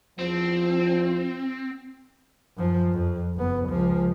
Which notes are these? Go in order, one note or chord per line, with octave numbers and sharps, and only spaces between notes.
E2 F3 C4
F#2 F3
F2
F#1 B3
C#2 F3